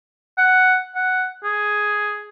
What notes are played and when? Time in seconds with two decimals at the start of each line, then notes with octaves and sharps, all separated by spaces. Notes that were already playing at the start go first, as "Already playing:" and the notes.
0.38 F#5
0.95 F#5
1.44 G#4